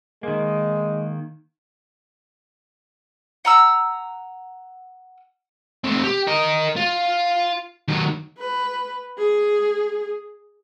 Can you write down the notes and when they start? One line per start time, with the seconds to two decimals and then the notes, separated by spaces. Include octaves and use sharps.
0.23 D#3 G#3 A#3
3.45 F#5 A#5 E6
5.84 A3 C4
6.04 G4
6.27 A#4 D#5
6.76 F4
7.88 D#3 F#3
8.38 B4
9.18 G#4